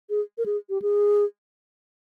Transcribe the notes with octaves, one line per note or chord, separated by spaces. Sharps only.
G#4
A#4
G#4
G4
G#4